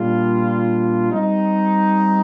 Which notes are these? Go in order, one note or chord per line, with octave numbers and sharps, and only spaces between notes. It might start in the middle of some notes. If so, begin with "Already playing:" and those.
Already playing: A#2 G3 D4 F4
G3 C4 D#4